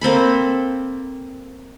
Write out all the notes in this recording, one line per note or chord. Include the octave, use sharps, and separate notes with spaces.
A#3 C4 A4 B5